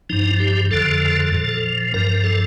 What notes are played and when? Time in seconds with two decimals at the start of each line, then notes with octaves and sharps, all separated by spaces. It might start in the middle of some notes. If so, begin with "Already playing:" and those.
0.10 G2 F3 D#4
0.40 G4
0.71 F2 D3 F3 A4
1.33 A#2 F3
1.94 G2 F3 A#4
2.24 A4